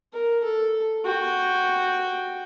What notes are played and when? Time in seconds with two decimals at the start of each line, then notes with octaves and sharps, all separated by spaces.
0.13 A#4
0.44 A4
1.04 F#4 G5